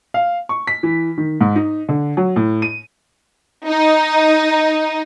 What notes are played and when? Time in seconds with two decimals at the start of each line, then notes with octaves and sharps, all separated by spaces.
0.14 F5
0.49 C#6
0.67 B6
0.83 E3
1.18 D#3
1.41 G#2
1.56 D#4
1.89 D3
2.17 F#3
2.36 A2
2.62 D#7
3.67 D#4